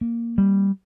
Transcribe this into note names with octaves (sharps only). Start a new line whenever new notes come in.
A#3
G3